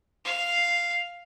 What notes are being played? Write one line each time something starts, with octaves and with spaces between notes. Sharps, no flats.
F5